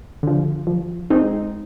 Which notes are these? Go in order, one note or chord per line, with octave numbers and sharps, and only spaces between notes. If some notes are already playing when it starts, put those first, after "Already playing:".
D3 F3
F3
G#3 C4 D#4